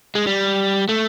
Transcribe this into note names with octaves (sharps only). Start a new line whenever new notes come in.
G#3
G3
A3